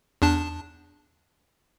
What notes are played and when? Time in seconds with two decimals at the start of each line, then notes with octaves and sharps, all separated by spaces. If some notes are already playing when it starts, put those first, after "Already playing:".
0.22 E2 D4 A5